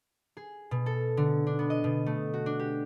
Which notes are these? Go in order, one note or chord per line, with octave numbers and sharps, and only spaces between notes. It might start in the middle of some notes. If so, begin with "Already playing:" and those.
G#4
B2
A4
D3
D4
B3
D#5
B2
A3
F#4
D4
G4